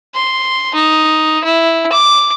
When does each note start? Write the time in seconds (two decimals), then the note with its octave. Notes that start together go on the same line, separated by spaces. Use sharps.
0.15 C6
0.74 D#4
1.44 E4
1.92 D6